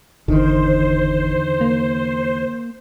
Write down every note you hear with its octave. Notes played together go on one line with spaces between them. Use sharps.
G1 E2 D3 D#3 C5
A#3